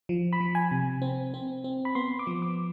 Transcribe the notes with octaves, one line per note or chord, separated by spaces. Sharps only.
F3
B5
F3
G#5
C3
C4
C4
C4
B5
B3 C6
D6
F3
D6